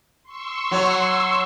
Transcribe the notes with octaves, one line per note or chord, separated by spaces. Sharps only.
C6 C#6 E6
F#3 C#5